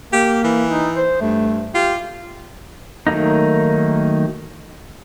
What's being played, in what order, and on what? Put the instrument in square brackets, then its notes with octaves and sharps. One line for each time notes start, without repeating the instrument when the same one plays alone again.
[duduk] A#3 [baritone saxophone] G4
[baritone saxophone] E3
[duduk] D#4
C5
[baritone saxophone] G2 [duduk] A3
[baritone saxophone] F4 [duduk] G4
[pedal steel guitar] D#3 F#3 A3 A#3 D#4